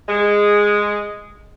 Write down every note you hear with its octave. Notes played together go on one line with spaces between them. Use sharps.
G#3